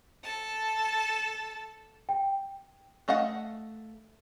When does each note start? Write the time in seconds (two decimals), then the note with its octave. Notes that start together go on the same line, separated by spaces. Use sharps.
0.24 A4 A5
2.09 G5
3.08 A3 D#5 F5 F#5